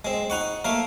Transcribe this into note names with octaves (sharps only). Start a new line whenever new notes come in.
G#3 C4
D#4 F#5 C#6
A3 A#3 A#4